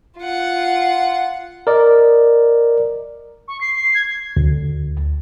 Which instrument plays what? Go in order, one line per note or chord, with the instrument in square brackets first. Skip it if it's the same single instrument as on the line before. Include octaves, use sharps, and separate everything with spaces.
[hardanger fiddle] F4 F#5
[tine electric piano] A#4 D5 D#5
[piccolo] C#6
C7
C7
G#6
[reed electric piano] D2